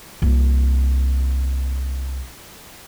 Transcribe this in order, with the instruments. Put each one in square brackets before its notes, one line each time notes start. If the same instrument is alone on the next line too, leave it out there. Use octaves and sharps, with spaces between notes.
[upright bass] C2 A#3